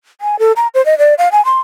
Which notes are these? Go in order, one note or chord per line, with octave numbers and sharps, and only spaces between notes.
G#5
A4
A#5
C5
D#5
D5
F5
G#5
C6